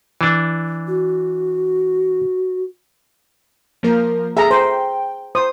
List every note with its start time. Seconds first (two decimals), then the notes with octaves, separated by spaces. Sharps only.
0.21 E3 D4
0.87 F#4
3.83 F3 A#3 A#4
4.37 G#4 A4 E5 A#5
4.51 C5 G5
5.35 C5 D#6